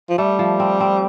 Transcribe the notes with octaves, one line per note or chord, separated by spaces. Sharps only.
F3
G3 A3
F3
C4
C4